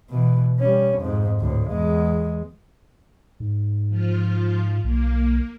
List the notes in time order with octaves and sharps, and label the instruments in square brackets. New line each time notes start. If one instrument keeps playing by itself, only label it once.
[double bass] B2 E3
G3 C#4
F2 G#2
D2 A2
E2 G#3
[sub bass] G#2
[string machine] F3 F4
[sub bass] B1 [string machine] A#3